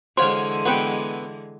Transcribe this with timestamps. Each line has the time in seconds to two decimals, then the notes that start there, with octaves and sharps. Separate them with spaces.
0.17 D3 E3 G#3 F#4 C5 C#5 F5 C6
0.66 B3 F#4 B4 F#5 G5